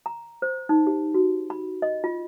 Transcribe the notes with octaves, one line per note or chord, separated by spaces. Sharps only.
A#5
C5
D#4
G4
F#4
B5
D#5
F4